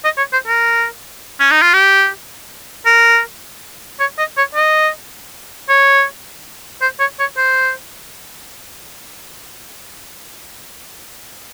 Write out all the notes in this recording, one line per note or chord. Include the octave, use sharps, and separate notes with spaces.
D#5
C#5
C5
A#4
C#4
D#4
F4
G4
A#4
C#5
D#5
C#5
D#5
C#5
C5
C#5
C#5
C5